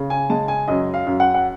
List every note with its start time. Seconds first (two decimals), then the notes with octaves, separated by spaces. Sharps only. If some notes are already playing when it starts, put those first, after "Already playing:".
Already playing: C#3
0.10 G#5
0.30 G#3 A5
0.48 G#5
0.68 F#2 D#5
0.94 F5
1.07 F#2
1.20 F#5
1.34 F#5